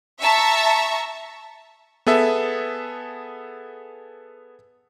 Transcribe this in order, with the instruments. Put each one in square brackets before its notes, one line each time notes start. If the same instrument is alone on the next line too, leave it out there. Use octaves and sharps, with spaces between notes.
[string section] E5 A5 A#5 C#6
[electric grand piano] B3 G#4 A4 E5